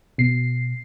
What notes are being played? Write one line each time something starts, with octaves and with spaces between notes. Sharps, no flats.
B2 C7